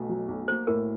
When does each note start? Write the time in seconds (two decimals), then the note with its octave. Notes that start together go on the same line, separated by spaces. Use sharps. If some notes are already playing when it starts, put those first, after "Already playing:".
Already playing: B1 B2 A3
0.09 F#3
0.28 B1
0.48 A#3 C5
0.67 A2 A#4